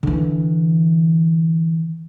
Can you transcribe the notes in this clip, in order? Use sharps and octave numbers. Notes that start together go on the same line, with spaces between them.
D3 E3